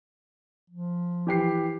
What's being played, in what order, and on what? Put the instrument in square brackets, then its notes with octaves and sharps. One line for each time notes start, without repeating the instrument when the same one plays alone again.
[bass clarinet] F3
[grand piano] E3 G4 C7